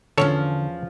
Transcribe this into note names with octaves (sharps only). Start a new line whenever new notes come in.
E2 D3 F3 C#4 A4 C#5